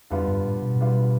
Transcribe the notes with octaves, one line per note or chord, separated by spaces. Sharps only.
F2 D3 G3 B3 F4
G2
A2
B2
D3 G3 B3 F4